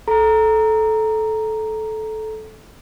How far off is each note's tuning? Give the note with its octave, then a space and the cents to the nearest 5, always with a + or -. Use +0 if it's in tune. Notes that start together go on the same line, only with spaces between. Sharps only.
A4 -15 A#5 +0